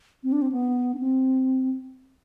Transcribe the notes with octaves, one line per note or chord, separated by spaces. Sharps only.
C4
D4
C4
B3
D4
C4